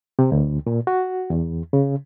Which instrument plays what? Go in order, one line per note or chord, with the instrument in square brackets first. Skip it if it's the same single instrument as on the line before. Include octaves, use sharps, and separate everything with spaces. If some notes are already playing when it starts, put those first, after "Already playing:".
[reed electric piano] C3
D2
A#2
F#4
E2
C#3